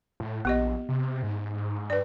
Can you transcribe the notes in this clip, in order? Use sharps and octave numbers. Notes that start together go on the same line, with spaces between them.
A2
A#1 B3 G4 D#5
C3
G#2
G2 B4 D5